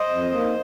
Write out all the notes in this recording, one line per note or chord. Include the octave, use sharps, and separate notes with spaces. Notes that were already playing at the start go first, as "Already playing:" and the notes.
Already playing: C5 D#5
F2
D#3 A#3